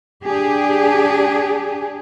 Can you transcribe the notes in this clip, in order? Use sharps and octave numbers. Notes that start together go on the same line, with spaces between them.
D4 G4 G#4